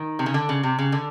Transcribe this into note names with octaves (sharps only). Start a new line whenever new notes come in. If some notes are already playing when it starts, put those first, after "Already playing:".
Already playing: D#3
C3
C#3
D3
C#3
C3
C#3
D3